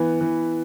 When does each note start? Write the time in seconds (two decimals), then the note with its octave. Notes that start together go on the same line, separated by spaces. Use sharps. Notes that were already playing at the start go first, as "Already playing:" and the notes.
Already playing: E3 B3
0.20 E3